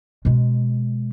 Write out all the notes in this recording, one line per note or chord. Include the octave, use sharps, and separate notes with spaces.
B2 G#3